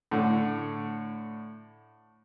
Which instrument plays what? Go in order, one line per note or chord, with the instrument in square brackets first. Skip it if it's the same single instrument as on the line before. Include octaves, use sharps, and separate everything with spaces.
[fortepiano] A2 D3